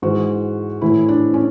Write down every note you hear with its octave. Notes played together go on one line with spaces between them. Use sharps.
G#2 E3 F#4
A2 E3 E4
D4
C#4